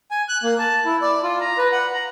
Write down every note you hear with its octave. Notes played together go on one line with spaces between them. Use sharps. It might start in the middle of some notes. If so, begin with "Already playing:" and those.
G#5
F#6
A#3
A5
E4
D5
F4
A#5
B4
F#5
A#5